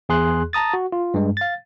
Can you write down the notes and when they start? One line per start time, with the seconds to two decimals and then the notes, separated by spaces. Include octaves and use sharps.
0.09 E2 G#4 C6 F#6
0.53 A5 A#5 D#6 A6
0.74 F#4
0.92 F4
1.14 G2 G#3
1.37 F5 A6